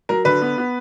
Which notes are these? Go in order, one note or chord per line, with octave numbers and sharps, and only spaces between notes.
F#3 A#4
D3 B4
B3
B3